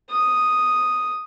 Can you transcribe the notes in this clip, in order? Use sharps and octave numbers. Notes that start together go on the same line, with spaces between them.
D#6